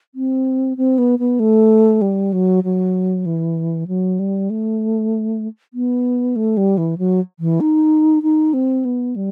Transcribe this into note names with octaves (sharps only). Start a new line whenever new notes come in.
C4
C4
B3
B3
A3
G3
F#3
F#3
E3
F#3
G3
A3
B3
A3
G3
E3
F#3
E3
D#4
D#4
C4
B3
G3